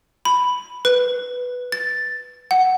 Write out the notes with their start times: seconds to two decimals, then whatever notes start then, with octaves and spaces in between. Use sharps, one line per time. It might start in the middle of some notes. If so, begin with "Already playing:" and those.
0.25 B5
0.85 B4
1.72 A6
2.51 F#5